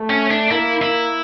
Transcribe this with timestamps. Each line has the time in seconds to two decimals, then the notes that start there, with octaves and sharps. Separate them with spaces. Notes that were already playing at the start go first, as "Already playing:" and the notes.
Already playing: A3
0.10 C#4
0.31 D4
0.50 A#3 E4
0.82 E4